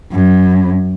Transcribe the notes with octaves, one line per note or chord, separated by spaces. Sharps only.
F#2